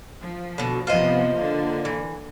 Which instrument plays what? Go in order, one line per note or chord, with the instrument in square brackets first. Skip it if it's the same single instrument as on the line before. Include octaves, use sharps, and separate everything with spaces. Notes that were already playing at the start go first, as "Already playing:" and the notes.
[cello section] F3
[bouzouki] B2 D3
[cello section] C3 F3 B3 [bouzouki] F4 C5 D#5
[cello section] D3 A#3
[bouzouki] E3